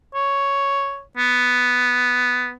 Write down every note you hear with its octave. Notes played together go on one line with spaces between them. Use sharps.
C#5
B3